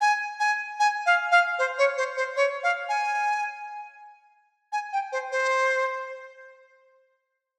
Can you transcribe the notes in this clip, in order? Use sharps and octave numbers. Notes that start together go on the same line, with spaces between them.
G#5
G#5
G#5
F5
F5
C5
C#5
C5
C5
C#5
F5
G#5
G#5
G5
C5
C5